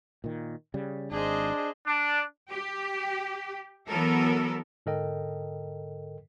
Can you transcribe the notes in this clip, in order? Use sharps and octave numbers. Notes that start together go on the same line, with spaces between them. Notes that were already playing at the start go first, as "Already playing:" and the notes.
A#2 D#3
C#3 G3
G#1 D4 G#4 C5 D#5
D4
G4
E3 F#3 B3 A4 A#4
G#2 D3 A4 A#4 D#5 G5